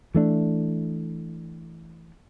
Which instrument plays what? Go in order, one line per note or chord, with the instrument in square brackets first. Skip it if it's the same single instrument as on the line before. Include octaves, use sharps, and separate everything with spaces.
[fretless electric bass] E3 A3 D4